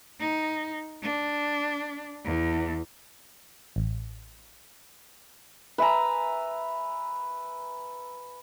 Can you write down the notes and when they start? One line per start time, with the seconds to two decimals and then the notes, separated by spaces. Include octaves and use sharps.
0.20 D#4
1.02 D4
2.25 E2
3.76 A1
5.78 B4 E5 G#5 A#5